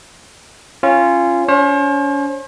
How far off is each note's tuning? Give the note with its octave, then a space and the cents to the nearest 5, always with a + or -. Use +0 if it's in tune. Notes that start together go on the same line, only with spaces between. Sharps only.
C#4 -15 F4 -15
C#4 +35 C5 +45